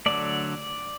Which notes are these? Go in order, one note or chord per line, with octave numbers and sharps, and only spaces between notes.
D3 F#3 A3 D5